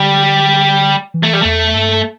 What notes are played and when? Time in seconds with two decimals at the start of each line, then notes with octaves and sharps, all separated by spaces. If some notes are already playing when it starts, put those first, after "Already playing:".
Already playing: D3 G3
1.14 E3
1.23 A3
1.33 G3
1.42 E2 A3
1.75 G2